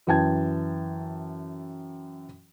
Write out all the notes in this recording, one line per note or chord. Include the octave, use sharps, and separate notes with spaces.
F#2 E3 G5 A5 G#6